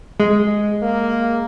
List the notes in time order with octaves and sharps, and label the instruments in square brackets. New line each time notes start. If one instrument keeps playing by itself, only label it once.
[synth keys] G#3
[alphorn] A#3